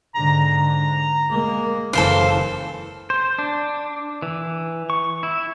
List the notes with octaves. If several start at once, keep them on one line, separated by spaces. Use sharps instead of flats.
G#2 D3 A#5
G#3 A#3
F#1 E3 A4 C5 F5
C5
D4
E3
C#6
E4